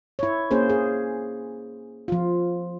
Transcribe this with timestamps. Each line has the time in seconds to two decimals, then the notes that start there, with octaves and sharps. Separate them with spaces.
0.19 E4 C#5
0.51 A#3 C#4 G#4 C5
0.70 G#4
2.08 F3 F4